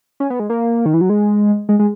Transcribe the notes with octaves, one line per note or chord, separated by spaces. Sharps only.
C#4
B3
G#3
A#3
D#3
E3
F#3
G#3
G#3
G#3